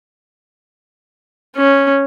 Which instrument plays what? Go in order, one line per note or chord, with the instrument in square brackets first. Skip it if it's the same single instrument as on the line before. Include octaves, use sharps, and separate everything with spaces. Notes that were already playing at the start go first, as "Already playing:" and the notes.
[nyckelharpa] C#4